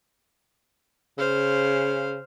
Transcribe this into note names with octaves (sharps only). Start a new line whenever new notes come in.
C#3 C5 F5